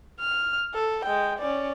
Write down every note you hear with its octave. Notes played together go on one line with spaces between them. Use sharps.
F6
A4
G#3 G5
C#4 D5